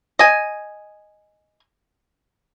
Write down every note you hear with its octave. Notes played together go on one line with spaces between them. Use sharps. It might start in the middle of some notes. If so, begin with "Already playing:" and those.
D#5 G#5